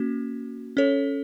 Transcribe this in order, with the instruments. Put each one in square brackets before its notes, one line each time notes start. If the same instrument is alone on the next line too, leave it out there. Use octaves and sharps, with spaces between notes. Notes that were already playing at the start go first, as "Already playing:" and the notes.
Already playing: [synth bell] A#3 C#4 F#4
C#4 A4 C#5